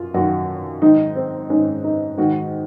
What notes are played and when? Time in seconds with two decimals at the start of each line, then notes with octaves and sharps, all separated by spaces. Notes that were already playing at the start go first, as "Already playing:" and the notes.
Already playing: F#2 F4
0.14 F#2 D#3 F#4
0.82 G#2 D#3 D#4
1.16 C4
1.50 G#2 D#3 C#4
1.84 D#4
2.18 G#2 D#3 F#4